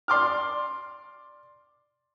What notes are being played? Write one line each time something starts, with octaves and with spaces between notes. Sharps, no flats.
D5 C6 D6 F6